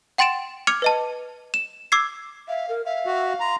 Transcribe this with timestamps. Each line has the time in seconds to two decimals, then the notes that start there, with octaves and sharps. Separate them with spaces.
0.18 F#5 G5 C6 A6 D7 E7
0.67 D6 F6 G#6 C#7 F7
0.82 B4 D#5 A5
1.54 E7
1.92 D6 E6 G#6 C7
2.48 E5 F5
2.68 A#4
2.85 E5 F5
3.06 F#4
3.40 A#5 C6